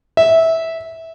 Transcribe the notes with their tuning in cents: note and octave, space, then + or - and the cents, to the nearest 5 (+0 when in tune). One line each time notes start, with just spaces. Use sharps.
E5 -15